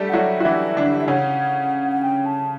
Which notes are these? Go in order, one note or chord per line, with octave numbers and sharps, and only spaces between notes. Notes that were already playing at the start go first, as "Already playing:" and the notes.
Already playing: G3 A3 G4 A4
F#5
F#3 F#4 E5
F#4
E3 E4
D3 D4
E5
C#3 C#4 F#5
F#5
G5
A5